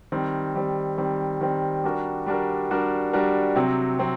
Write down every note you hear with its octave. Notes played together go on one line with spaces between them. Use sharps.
D#3 G3 C4
D#3 G3 C4
D#3 G3 C4
D#3 G3 C4
G3 D4 F#4 A#4
G3 D4 F#4 A#4
G3 D4 F#4 A#4
G3 D4 F#4 A#4
C3 F#3 C4
F#3 C4